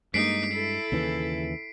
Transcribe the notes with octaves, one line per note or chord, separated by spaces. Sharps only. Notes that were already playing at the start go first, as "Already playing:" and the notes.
G2 G#3 A#3 D#4 B6 C7 D7
E4 A4
D#2 C#3 E3